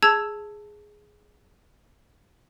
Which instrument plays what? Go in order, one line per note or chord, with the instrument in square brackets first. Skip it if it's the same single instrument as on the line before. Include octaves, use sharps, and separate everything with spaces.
[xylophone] G#4 A5 E6 G#6